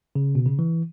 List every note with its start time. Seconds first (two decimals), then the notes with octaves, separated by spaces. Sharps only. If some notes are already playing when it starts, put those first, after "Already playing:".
0.15 C#3
0.35 B2
0.46 C#3
0.59 E3